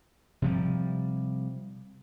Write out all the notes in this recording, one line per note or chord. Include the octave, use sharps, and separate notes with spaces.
C3 F3 G3